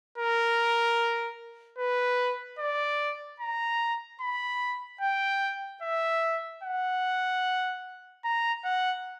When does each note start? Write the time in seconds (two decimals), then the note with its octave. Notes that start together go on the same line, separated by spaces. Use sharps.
0.18 A#4
1.78 B4
2.59 D5
3.40 A#5
4.21 B5
5.01 G5
5.82 E5
6.64 F#5
8.25 A#5
8.65 F#5